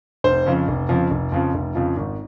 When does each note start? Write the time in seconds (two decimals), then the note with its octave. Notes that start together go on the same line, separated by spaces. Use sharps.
0.24 F1 C5
0.46 F2 C#3 F3
0.68 F1
0.89 F2 C#3 F3
1.11 F1
1.32 F2 C#3 F3
1.54 F1
1.75 F2 C#3 F3
1.97 G#1